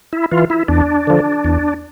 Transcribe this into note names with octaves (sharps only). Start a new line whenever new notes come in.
E4
E3 F4
E4
E2 D4
D3 F3
E2